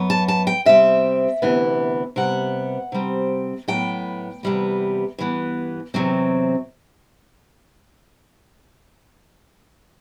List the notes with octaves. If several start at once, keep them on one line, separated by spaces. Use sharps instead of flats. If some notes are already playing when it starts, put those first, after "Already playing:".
Already playing: F#2 F#3 B3
A5
A5
G5
C3 G3 C4 E5
D2 C3 E3 B3
C3 G3 B3 F#5
C3 G3 C4
A2 F#3 B3 G5
E2 C3 G3 B3
G2 E3 B3
E2 C3 F#3 C4